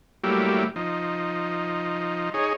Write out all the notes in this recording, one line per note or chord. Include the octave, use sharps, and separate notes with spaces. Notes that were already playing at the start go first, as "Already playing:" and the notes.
F#3 G3 A3 A#3 E4 G4
F3 D#4
D#4 G#4 C#5